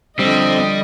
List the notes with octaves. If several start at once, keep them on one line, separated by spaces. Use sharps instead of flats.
F2 D3 G3 C4 D4 D#5